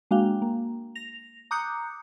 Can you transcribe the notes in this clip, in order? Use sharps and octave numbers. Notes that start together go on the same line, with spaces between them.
G#3 A#3 D4 F#4 F5 G5
A#3
A#6 F7
A#5 D6 D#6 F#6 G6 C#7